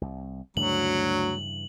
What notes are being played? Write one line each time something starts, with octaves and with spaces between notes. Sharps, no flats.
C2
D2 G2 C#3 E3 F#3 F#7